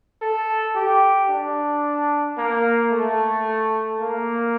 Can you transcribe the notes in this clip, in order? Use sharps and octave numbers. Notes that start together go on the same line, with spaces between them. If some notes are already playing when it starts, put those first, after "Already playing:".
A4
G4
D4
A#3
A3
A#3